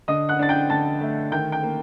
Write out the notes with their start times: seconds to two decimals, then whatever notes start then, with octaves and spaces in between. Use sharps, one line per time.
0.08 D3 D#5 D#6
0.29 F#5 F#6
0.39 D4 A6
0.49 G5 G6
0.70 D3 A5 A6
1.01 A3
1.32 D#3 G5 G6
1.52 G5 G6
1.63 A#3